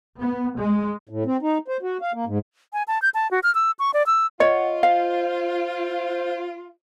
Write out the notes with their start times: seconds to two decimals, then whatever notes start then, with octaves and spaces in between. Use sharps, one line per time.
0.22 B3
0.58 G#3
1.09 A2
1.26 C4
1.42 D#4
1.68 C5
1.82 F#4
2.02 F5
2.14 A#3
2.27 G#2
2.73 G#5
2.88 A5
3.02 G6
3.14 A5
3.31 F#4
3.43 F6
3.55 E6
3.79 C#6
3.94 D5
4.07 E6
4.40 F4 C#5 D#5 F#5
4.83 C5 F5